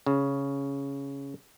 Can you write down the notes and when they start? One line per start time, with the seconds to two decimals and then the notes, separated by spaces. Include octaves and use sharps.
0.06 C#3